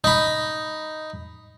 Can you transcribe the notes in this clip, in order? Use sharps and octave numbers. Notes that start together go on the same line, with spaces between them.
D#4 B5